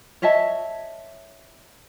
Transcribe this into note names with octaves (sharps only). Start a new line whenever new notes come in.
C#5 D#5 E5 A5